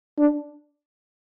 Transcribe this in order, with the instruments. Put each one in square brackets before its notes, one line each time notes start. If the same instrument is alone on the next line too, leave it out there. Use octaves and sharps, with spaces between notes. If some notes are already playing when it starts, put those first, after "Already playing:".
[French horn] D4